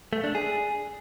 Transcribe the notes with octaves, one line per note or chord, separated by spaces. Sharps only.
A3
D4
G#4